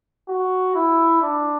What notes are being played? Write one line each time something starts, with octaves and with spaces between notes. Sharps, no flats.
F#4
E4
D4